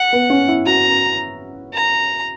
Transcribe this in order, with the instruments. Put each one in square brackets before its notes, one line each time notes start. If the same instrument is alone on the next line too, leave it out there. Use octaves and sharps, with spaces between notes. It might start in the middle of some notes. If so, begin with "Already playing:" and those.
Already playing: [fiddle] F#5
[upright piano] B3
C#4
E4
[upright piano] F#4 [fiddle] A#5
[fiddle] A#5